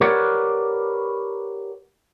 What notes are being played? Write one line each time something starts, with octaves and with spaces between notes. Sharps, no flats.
G4 A#4 B4 C#5 D5 F#5